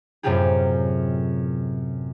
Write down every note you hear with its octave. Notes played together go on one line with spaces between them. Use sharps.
F#2 A2 C3 F4 G4 G#4